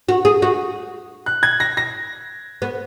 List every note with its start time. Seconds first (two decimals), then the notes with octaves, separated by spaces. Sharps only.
0.09 F#4
0.25 G#4
0.42 F#4
1.26 F#6
1.43 G#6
1.60 A#6
1.77 A#6
2.62 B3